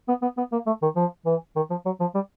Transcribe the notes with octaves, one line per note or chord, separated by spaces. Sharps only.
B3
B3
B3
A#3
A3
D#3
F3
E3
D#3
F3
F#3
F3
G3